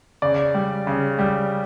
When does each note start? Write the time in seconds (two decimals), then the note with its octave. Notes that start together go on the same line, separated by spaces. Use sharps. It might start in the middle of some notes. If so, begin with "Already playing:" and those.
0.22 C#3 D5
0.54 G3
0.87 C#3
1.19 G3